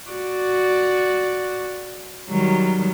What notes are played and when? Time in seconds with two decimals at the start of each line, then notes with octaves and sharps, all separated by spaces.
0.11 F#4 D5
2.29 D#3 F#3 G3